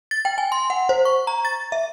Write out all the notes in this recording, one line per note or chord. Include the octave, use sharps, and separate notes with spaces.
A6
G5
G#5
C6
F#5
C5
C#6
A#5
A6
E5